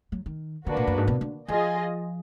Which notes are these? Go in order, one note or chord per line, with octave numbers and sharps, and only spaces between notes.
F#3
D#3
D3 A#3 D4 F#4 B4
A#2
F#2
G#2
B2
D3
F3 F4 G#4 D#5